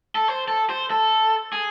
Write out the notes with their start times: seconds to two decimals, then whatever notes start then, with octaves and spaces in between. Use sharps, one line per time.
0.15 A4
0.28 C5
0.48 A4
0.70 C5
0.91 A4
1.53 G#4